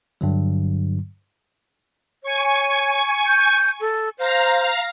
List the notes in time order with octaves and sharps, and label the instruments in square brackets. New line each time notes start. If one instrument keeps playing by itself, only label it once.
[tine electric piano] G2 D3 F#3
[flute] C#5 [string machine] G#5 C#6
[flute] G6
A4
[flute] C5 [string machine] F5 A#5